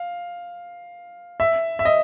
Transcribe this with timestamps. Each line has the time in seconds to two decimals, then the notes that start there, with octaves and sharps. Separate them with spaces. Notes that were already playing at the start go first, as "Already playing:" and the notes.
Already playing: F5
1.40 E5
1.79 E5
1.85 D#5